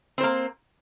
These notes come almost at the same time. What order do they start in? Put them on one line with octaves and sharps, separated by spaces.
C4 C5 A#3